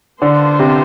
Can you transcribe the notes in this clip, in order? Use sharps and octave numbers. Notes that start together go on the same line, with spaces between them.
D3 B3 D4 F4 C5
C3